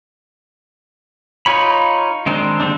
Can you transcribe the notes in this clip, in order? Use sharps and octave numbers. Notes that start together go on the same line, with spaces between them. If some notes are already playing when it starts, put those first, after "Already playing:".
D#4 F4 C#5 B5
D#3 G#3 C4 D4
D3 G3 A#3 C4 D4